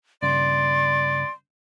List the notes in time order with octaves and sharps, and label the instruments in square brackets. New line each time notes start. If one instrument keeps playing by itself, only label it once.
[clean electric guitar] G2 C#3 [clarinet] D5 [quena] C6